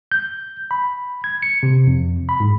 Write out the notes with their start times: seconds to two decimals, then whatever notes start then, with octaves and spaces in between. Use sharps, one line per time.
0.12 G6
0.71 B5
1.24 G#6
1.42 C#7
1.63 C3
1.87 F2
2.29 B5
2.40 G#2